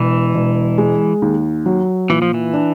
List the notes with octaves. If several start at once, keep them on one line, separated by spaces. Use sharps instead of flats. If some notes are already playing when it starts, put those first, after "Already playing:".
Already playing: E1 E3
E1
G#3
D#2
F#3
A#2 E3
F3
E3
D4